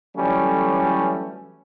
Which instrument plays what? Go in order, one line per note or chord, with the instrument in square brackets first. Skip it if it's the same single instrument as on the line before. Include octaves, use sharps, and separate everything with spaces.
[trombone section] D3 E3 F#3 G3 A3 C#4